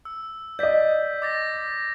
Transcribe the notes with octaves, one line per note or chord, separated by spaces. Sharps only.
E6
D5 D#5 G6 B6
D6 A6 A#6